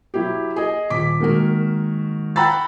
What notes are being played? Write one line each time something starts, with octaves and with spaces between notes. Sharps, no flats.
F#3 E4 G4
G#4 D#5
D#1 D6 B6
D#3 G#3 A#3 F#4 A#4
F#5 G5 A#5 B5 E6 A6